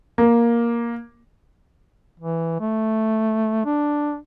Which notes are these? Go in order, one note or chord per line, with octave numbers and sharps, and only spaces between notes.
A#3
E3
A3
D4